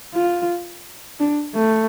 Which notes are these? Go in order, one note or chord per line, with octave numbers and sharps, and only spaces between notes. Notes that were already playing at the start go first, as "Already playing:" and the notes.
F4
D4
A3